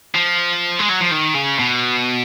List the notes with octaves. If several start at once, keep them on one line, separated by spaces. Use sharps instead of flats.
F3
G#3
F#3
F3
D#3
C#3
B2